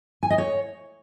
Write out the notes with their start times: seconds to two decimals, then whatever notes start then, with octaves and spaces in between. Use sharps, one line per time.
0.23 G#5
0.30 D#5
0.38 C#5